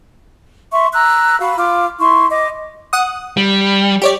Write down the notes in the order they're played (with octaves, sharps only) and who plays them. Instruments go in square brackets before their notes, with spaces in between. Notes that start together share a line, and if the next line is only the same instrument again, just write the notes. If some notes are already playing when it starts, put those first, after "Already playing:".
[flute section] E5 C6 C#6
A#5 E6 F#6
F#4 F5 B5
F4 D6
E4 C6 C#6
D#5 D6
[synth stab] F#5 D#6
[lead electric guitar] G3
[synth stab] G4 C#5 D5